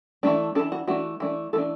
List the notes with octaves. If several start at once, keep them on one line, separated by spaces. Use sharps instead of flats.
E3 A3 D4
E3 D4 A4
F#4
E3 A3 D4 F#4
E3 A3 D4
E3 A3 D4 A4